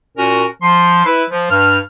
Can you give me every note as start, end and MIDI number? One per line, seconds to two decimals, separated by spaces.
0.18 0.45 46
0.18 0.45 61
0.18 0.45 66
0.18 0.45 70
0.62 1.04 53
0.62 1.04 84
1.05 1.23 64
1.05 1.23 71
1.30 1.48 53
1.51 1.79 43
1.51 1.79 89